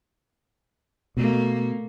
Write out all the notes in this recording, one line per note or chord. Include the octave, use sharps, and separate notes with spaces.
B2 A3 A#3